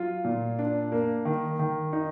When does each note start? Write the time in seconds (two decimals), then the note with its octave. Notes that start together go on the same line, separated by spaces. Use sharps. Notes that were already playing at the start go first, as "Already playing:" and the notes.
Already playing: F#3 F4
0.24 A#2
0.59 D4
0.92 A#3
1.25 D#3
1.59 D#3
1.93 D#4